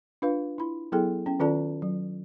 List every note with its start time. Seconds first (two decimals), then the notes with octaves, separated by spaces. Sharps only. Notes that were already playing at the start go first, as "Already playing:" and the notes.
0.22 D4 F4 B4 F5
0.58 E4 B5
0.92 F#3 B3 E4 G#4 A4 G5
1.26 C#4 G5
1.39 D#3 C#4 F4 A4 D5 A5
1.82 F#3